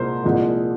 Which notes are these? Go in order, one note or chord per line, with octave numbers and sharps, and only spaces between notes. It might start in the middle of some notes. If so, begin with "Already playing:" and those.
Already playing: C2 A#2 G#3 A#4 C5
C2 A#2 F3 G#3